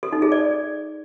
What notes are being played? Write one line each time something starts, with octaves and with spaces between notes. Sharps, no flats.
A4
D#4
G#4
D5